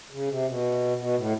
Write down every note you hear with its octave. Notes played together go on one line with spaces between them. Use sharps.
C#3
C3
B2
B2
A2